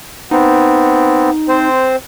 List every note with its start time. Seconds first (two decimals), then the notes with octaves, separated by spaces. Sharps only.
0.31 B3 C4 D#4
1.48 C4 C5